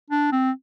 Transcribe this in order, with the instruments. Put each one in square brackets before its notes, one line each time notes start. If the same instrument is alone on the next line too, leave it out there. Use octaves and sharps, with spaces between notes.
[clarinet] D4
C4